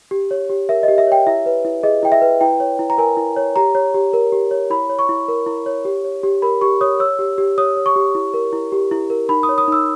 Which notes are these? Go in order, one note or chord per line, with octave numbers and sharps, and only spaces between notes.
G4
C#5
G4
A#4 E5
D#5
G4
E5
C#5 G5
E4 E5
B4
E4
G#4 D#5
E4 G5
E5
B4
E4 G5
C#5
E4
A#5
A#4 G#5
E4
C#5
G4 A#5
C#5
G4
A#4
G4
C#5
E4 B5
C#5
C#6
E4
A#4
E4
C#5
G4
C#5
G4
A#4 B5
G4 C#6
C#5 D#6
C#5 E6
G4
G4
C#5 D#6
C#5
C#6
G4
E4
A#4
E4
G4
E4
A#4
D#4 B5
D#6
C#5
D#6
D#4 E6